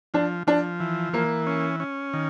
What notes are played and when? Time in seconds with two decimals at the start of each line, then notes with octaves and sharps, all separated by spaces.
0.14 F3 D4
0.47 F3 D4
0.80 E3
1.13 E3 A#3
1.47 C#4
1.80 C#4
2.13 D#3